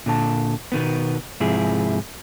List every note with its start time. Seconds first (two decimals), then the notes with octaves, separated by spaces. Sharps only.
0.06 A#2 D3 A5
0.72 B2 D#3 B3
1.40 G#2 C3 F3 E4 G#4